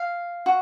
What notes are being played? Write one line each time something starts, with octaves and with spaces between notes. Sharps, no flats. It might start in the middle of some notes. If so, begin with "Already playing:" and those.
Already playing: F5
F#4